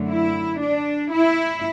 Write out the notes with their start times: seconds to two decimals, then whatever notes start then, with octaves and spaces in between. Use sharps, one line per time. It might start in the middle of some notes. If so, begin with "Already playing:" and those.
Already playing: F#2 D3 F#3 A3
0.09 E4
0.61 D4
1.13 E4